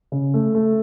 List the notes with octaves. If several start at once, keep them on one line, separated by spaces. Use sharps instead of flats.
C#3
A3
A3